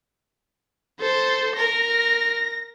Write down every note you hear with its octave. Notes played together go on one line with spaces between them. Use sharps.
A4 C5
A#4 A#6